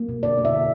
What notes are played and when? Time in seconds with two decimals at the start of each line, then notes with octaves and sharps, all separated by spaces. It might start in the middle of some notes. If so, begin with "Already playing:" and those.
Already playing: A#3
0.09 B2
0.23 D3 D5
0.38 A#3
0.45 E5
0.53 D3